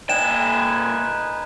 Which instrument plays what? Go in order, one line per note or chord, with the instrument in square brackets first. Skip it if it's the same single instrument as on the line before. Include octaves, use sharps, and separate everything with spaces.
[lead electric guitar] A#2 G5 [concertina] D#4 B4 [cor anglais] G#5 [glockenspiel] E7